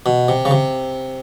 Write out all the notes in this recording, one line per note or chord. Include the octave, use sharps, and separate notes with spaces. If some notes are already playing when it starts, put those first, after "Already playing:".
B2
C3
C#3
C3